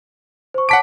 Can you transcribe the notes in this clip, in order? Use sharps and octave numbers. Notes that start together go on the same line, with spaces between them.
C5 C#6
C#5 F#5 A5 D6 B6 D7